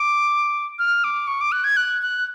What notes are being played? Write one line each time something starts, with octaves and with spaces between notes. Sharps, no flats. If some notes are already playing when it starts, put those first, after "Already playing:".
Already playing: D6
F6
D6
C#6
D6
F#6
G#6
F#6
F#6